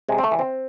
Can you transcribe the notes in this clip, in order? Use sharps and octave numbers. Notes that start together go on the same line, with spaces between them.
C3 G#3
C4
A3
E3
C4